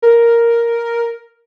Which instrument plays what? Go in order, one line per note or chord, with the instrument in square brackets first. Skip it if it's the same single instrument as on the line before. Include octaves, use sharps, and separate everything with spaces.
[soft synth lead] A#4